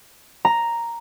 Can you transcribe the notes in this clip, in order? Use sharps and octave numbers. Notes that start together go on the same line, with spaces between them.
A#5